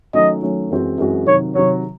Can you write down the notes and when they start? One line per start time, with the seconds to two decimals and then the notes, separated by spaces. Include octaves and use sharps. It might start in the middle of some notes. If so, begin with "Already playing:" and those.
0.14 D#3 F#3 A3 C#4 D#5
0.42 D#3 F#3 A3 C#4
0.70 F#2 E3 G#3 C4 F#4
0.98 F#2 E3 G#3 C4 F#4
1.27 C3 D#3 F#3 C#5
1.55 C3 D#3 F#3 C#5